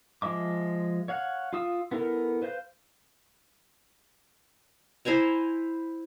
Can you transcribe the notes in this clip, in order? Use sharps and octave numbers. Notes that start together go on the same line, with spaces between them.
F3 G#3 E5 D6
C#5 F5 F#5
F4 F5 D#6 E6
B3 E4 A4 A#4
B4 C5 F5 G6
E4 C5 G#5 A#5